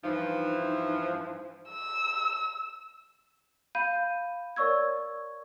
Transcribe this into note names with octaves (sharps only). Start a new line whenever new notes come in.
G2 E3 F3 D#4
E6
F5 B5 G6 D#7
A#4 C#5 D5 C#6 E6 G#6